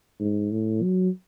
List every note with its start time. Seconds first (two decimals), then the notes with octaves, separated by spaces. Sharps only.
0.20 G#2
0.51 A2
0.82 F#3